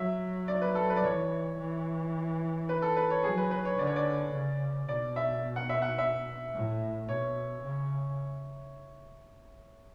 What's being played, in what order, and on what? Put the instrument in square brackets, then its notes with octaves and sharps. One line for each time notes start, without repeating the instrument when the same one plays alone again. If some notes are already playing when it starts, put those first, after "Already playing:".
Already playing: [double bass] F#3 [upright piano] E5
[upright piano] D5
B4
A4
B4
D5
[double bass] E3 [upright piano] C#5
[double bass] E3
[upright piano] B4
A4
B4
C#5
[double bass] F#3 [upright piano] G#4
[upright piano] B4
B4
C#5
[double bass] D3 [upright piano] D5
[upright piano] C#5
D5
[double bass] C#3
[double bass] B2 [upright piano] D5
[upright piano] E5
F#5
E5
F#5
E5
[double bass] A2
[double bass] B2 [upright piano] C#5
[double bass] C#3